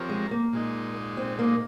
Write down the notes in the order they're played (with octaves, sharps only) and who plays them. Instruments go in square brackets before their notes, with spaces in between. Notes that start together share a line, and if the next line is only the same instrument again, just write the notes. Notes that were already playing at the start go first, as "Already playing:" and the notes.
Already playing: [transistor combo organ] F3 C4 G4 A#4 C#5
[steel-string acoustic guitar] G#3
A#3
[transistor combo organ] A#2 G#3 D#4
[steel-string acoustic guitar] C4
A#3